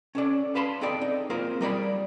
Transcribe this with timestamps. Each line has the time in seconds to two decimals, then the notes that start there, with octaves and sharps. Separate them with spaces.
0.15 C#4 A4 D5
0.55 B4 F5 A5 B5 C6
0.81 C4 D#4 G#4 A4 D5
1.01 D#4
1.30 A#3 C4 F4 G#4 A#4 C5
1.61 G3 A#4 D5 B5